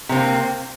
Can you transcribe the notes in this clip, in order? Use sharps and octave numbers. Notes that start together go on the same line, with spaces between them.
C3 A#3 C4